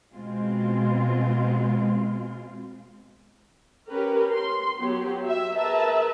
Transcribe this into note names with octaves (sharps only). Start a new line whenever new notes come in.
B2 G#3 C4 F4
C#4 G4 A#4 B4
C6
F#3 B3 G4
E5
G#4 A#4 B4 E5 A5 A#5